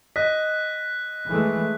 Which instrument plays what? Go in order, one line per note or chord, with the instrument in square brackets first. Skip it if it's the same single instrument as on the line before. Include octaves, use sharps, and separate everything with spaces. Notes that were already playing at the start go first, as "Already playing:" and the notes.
[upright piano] D#5 [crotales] F#6 B6
[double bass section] E3 G#3 A3